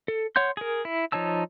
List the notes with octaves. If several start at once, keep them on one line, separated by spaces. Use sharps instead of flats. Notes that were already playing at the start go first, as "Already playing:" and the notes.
A4
C#5 F#5 C6 G6
G#4 A#4
E4
F3 D#4 C#5 A5 E6